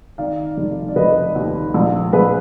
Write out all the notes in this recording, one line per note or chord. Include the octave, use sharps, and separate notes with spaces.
D#3 D5 F5
F1
D5
F1 B4 D#5
D#2
A#1
A#1 G#4 B4